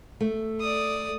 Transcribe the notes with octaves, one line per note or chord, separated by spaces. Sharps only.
A3
D5 D#6